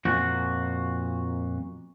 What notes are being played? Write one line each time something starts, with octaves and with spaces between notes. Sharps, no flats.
F2 A#2 F#4